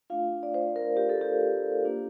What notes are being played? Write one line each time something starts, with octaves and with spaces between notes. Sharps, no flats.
A3 D4 F4 F5
D5
C5
A#4
G4
A4
G4
A#3 D4 F4